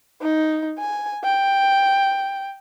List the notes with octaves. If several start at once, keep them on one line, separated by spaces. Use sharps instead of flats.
D#4
G#5
G5